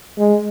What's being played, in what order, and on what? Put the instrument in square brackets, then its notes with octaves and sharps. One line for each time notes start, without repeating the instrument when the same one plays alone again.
[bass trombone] G#3